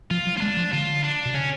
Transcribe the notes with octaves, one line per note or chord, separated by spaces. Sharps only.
F3 F4
F#3
A3 F4
G#3 D4
F3
D3 F4
D4
B2
C#3 C#4